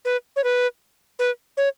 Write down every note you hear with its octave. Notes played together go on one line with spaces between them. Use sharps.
B4
C#5
B4
B4
C#5